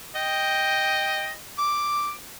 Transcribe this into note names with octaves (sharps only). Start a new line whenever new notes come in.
D#5 G5
D6